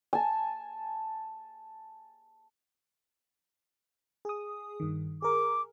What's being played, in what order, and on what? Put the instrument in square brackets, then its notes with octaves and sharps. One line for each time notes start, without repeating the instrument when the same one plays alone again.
[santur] G#5 A5
[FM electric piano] G#4 D#6
G2 D#3
[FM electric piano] G#4 A#4 [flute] D6